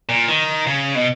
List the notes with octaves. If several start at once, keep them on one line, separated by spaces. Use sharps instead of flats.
A#2
D#3
C#3
B2